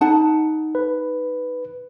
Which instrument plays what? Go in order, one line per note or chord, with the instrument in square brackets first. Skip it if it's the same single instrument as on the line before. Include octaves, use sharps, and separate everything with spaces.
[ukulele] D#4 F#5 A5
[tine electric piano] B4